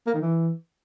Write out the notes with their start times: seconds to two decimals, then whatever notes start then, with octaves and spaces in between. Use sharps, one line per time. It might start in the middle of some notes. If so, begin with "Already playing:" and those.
0.07 A#3
0.14 D#3
0.22 E3